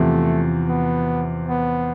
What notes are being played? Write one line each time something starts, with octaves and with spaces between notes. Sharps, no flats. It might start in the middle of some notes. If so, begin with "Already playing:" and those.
Already playing: E2 C3 F3 A3
B3
B3